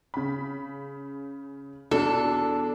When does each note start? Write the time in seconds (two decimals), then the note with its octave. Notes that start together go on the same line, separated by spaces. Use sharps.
0.14 C#3 B5
1.91 E2 B2 D4 A4